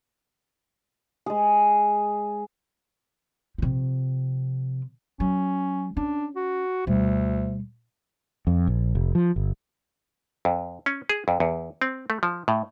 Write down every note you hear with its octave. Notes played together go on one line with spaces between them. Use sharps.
G#3 G#4
C3 F3
F#3 C#4
C#4 D4
F#4
D2 B2 G3
F2
A#1
F1
F3
G1
F2
C#4
G#4
F2
E2
C4
A3
F3
A2